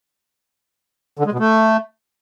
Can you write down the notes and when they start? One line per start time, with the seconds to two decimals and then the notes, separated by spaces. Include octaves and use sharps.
1.19 D3
1.26 G#3
1.33 B2
1.39 A3